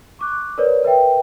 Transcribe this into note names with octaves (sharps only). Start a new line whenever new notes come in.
C#6 D6 F#6
A#4 B4 C#5 D5
A#4 B4 E5 G5